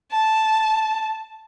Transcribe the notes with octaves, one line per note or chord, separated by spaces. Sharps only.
A5